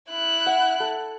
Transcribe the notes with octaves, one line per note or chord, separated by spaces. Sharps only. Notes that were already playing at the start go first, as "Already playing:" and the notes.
E4 F#6
F#5
A4